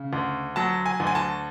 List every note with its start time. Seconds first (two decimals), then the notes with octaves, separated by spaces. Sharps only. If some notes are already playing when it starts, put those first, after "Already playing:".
Already playing: C#3
0.13 D2
0.56 F#3 A5
0.86 G#5
1.00 D2
1.07 G#5
1.15 A5